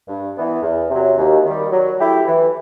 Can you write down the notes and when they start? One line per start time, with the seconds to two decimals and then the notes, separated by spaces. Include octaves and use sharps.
0.08 G2
0.36 E3 B3
0.63 E2
0.90 C3 F#3
1.17 D#2
1.45 D#3 G3
1.71 F#3
1.98 A3 E4 G4
2.26 E3